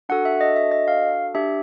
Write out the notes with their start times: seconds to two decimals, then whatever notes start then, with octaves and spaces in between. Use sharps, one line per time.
0.09 D4 F#4 A4 F#5
0.25 E5
0.41 D#5
0.56 E5
0.72 D#5
0.88 F5
1.35 D4 G4 E5